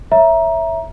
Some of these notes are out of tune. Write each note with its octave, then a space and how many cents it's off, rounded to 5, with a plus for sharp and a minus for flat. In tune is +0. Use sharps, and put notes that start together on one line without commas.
C#5 +0 E5 +0 A#5 +15